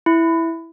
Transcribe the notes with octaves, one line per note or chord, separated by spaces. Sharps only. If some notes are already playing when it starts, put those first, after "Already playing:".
E4